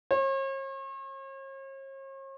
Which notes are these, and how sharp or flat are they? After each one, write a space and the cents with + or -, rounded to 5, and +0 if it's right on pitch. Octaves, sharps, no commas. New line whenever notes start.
C#5 -45